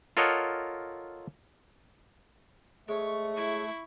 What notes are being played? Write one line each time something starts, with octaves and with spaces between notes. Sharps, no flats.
F4 A4 A#4 C#5 D#5 F#5
G#3 A3 C#5 C#6
E4 C#6